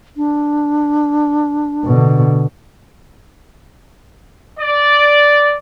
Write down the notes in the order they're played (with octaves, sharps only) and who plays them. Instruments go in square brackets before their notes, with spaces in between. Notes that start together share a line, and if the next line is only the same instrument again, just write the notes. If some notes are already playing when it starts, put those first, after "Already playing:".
[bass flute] D4
[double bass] B2 D3
[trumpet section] D5